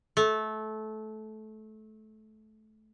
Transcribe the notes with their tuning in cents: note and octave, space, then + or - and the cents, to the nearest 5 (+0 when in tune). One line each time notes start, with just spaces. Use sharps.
A3 -20